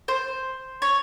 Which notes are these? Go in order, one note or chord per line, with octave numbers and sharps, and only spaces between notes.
C5
C#5